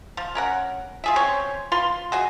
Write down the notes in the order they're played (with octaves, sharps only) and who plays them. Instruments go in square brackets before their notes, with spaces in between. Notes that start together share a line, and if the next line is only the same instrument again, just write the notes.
[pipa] F3 F4
C#4 A#4 F#5
F4 G#4 E5
C4 C#4 C5 C#5
F4 B4 F5 C6
F#4 G#4 D#5